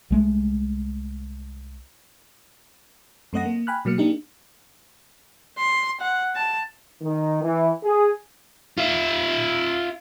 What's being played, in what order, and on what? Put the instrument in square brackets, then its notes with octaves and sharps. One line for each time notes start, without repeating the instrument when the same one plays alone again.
[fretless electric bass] C2 G#3 A3
[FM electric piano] F#2 A3 C4 D#5 F#5 A#6
A#3
G5 G#5 B5 F6 F#6
B2 F#3 A#3 F6 C#7
A#3 D4 D#4 G4
[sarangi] C6
F#5
A5
[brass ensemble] D#3
E3
G#4
[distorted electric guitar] F4 E5